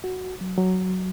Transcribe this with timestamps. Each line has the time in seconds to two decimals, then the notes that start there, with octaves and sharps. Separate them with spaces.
0.04 F#4
0.41 F#3
0.58 F#3